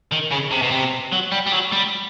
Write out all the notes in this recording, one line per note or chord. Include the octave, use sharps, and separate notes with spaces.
D#3
C#3
C3
B2
C3
F#3
G3
G3
F#3
G3